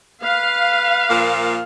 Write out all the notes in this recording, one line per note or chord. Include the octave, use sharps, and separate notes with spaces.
B4 F5
A#2 F3 A#3